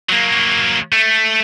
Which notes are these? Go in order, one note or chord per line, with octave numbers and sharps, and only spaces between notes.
F#3 A#3
A3